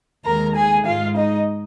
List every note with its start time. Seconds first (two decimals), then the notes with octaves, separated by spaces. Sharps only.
0.25 D#2 D#3 G#3 A#4 A#5
0.55 G#4 G#5
0.85 G#2 G#3 F4 F5
1.16 D#4 D#5